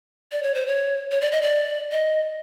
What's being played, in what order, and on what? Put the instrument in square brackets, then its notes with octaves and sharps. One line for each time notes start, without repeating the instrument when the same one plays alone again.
[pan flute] D5
C#5
C5
C#5
C#5
D5
D#5
D5
D#5